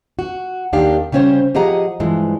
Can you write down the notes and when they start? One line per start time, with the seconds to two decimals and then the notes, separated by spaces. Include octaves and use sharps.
0.19 F#4
0.73 D#2 D#3 D4 G4 F5
1.12 C#3 G3 C#4 C5 C#5 G5
1.55 F3 G4 G#4 D#5 F#5 A#5
2.00 G2 E3 F3 G#3